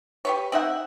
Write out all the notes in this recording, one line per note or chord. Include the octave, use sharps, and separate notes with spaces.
G4 B4 C#5
C4 D#4 E5 F#5